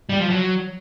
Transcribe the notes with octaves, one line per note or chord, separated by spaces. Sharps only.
G3
F3
F#3